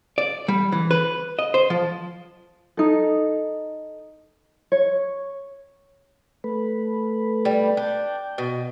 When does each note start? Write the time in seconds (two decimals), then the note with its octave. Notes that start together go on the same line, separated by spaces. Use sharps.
0.18 D5
0.48 G3
0.72 E3
0.91 B4
1.39 D#5
1.54 C5
1.70 F3
2.77 D#4 A4
4.72 C#5
6.44 A3 B4
7.45 G3
7.77 D4 G5
8.38 B2